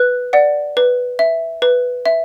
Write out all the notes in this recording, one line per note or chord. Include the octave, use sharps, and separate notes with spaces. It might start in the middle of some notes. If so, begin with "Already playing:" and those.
Already playing: B4 F#6
D5 F#5
B4
E5
B4
E5